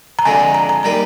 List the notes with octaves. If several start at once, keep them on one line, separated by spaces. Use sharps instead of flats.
A#5
F2 D3 G#3 D4 G#5
A#5
A#5
G3 A#3 D#4 A#5